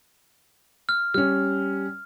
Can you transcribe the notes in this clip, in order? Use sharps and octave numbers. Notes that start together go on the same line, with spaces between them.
F6
G3 C#4 F6